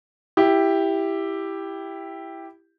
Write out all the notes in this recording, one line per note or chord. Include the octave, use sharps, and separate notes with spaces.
E4 G4